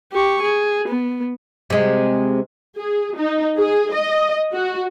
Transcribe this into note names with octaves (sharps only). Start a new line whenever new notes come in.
G4 C#6
G#4
B3
C3 G#3
G#4
D#4
G#4
D#5
F#4